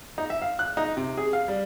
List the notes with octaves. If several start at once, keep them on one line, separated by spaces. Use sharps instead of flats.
D#4
E5
F5
F#6
D#4
C3
G#4
F5
G3